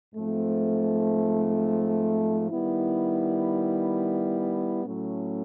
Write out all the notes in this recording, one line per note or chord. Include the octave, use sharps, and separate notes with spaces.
G#2 F3 A3 C4
D#3 G3 B3 E4
A2 F#3 A3 C#4